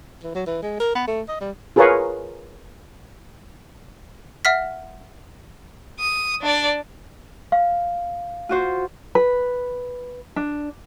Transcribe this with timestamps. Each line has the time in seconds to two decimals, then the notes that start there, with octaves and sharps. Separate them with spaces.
0.23 E3
0.35 F#3
0.46 E3
0.62 G#3
0.80 A#4
0.95 B3
1.07 A3
1.28 D#5
1.41 G3
1.76 F4 G#4 A#4 B4 C#5 F5
4.45 E5 F#5 F6 B6
5.99 D#6
6.42 D4 D5
7.52 F5
8.49 F4 F#4 C5
9.15 B4
10.36 D4